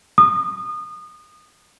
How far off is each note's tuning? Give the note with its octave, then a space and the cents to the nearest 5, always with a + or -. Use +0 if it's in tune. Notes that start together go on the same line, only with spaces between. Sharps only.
D#6 -30